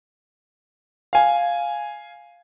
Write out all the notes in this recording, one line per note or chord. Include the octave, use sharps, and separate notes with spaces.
F5 G#5